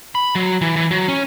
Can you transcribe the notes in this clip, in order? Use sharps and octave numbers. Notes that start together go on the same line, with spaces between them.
B5
F#3
E3
E3
F#3
C#4